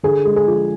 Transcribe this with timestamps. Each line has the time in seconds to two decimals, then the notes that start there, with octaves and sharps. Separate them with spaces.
0.03 D3 G#4
0.25 G#3
0.36 G#4
0.48 F3